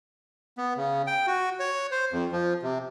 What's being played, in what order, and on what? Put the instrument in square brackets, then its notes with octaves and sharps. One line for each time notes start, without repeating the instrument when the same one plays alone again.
[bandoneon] B3
C#3
G5
F#4
C#5
C5
F2
F3
C3